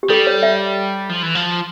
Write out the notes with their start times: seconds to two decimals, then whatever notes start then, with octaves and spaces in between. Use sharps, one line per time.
0.03 G4
0.10 G3 A4
0.27 C#5
0.43 E5
1.09 F3
1.23 E3
1.35 F3